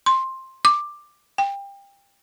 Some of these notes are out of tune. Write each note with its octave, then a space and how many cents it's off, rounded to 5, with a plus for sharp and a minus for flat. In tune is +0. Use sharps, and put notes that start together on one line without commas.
C6 +10
D6 +10
G5 +25